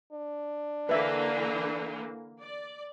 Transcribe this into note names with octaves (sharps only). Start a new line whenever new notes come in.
D4
D3 E3 A#3 B4 E5
D5